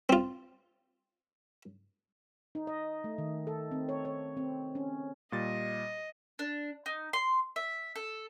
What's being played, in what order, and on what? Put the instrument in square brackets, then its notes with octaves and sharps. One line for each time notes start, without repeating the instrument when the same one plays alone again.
[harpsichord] C4 F4
[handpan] D#4
D#5
A3
D#3
A4
C4
C#5
C#5
C4
C#4
[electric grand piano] A#2 G3 A6 [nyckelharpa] D#5
[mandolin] D4
D#4
C6
E5
A4